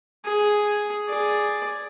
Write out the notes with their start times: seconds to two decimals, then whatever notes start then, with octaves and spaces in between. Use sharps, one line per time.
0.25 G#4
1.09 G#4 D5